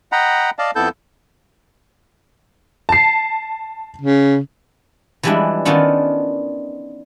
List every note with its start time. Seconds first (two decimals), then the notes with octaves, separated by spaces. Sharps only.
0.12 D#5 F#5 G5 A#5 B5
0.59 D5 D#5 F5 A5
0.76 F2 B3 E4 A4 A5 G6
2.89 A5 C7
4.01 C#3
5.23 E3 F3 G3 G#3 D4 E4
5.65 D#3 B3 C#4 D4 F4 A4